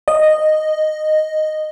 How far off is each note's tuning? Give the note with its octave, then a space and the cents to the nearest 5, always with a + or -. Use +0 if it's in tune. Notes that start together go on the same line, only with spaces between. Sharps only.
D#5 -10